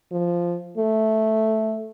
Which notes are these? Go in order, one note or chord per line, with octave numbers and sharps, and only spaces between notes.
F3
A3